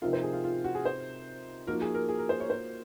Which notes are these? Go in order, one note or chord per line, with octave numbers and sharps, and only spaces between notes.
C3 F3 C4 D#4 F4 A#4
C5
G#4
F4
F4
F#4
G#4
C5
F3 A#3 D#4 F#4 A#4
G#4
A#4
G#4
A#4
C5
C#5
C5